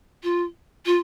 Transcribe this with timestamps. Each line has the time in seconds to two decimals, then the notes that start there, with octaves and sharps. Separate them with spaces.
0.23 F4
0.86 F4